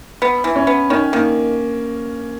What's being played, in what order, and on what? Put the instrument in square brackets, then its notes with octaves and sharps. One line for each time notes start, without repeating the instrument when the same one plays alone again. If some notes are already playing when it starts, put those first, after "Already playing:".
[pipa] B3
E3
[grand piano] C#4
[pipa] B3
[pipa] D#3 [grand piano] C#4
[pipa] D#3 [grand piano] A#3